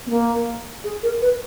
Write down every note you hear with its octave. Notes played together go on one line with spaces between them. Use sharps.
B3
A#3
G#4
A#4
B4